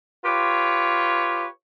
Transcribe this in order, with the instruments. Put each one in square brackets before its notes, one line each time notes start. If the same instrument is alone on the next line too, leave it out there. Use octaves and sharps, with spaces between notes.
[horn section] F4 G4 B4 C#5